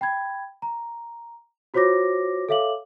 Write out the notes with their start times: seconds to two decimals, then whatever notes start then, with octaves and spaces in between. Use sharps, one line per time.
0.01 G5 B5 G#6
0.62 A#5
1.74 F4 F#4 C5 C#5 D6 A#6
2.49 A4 C#5 E5 F5 D6 F#7